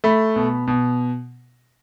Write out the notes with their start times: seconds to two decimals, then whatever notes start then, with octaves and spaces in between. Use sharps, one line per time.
0.04 A3 B5
0.36 B2
0.67 B2